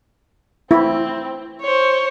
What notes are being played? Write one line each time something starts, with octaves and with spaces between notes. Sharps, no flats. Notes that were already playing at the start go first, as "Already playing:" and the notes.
C4 E4
C5 C#5